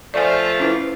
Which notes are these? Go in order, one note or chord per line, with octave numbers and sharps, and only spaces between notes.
F3 A3 F4 D5 G#5
C#4 E4 B4